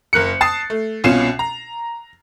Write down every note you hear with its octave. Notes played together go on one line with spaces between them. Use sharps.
F#1 A#4 F#6 C#7
A5 D#6 A6 C7
A3
C2 B2 C#4 F4 C7 E7
A#5